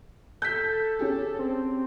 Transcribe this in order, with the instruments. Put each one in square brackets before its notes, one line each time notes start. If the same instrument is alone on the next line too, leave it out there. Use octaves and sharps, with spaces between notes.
[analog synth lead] A4 [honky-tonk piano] G6 B6
[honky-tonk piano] C#4 G4 G#4
[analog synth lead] C4